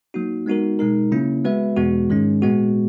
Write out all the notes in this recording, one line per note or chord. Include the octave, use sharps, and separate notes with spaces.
F#3 A#3 D#4 F#4
G#3 B3 D#4 F#4 A#4
B2 G#3 D#4 A#4
C#3 F#3 A#3 C#4 E4
G#3 B3 F#4 B4 E5
E2 B2 G#3 B3 F#4
G#2 D#3 G#3 C#4
A#2 G#3 B3 F#4